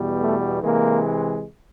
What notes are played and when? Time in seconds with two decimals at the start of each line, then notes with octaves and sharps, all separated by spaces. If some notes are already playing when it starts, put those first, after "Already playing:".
Already playing: E2 B2 G3
0.22 A3
0.63 C3 E3 G#3 A#3